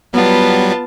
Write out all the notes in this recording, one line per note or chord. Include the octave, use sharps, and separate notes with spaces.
F#3 G3 B3 F4 A5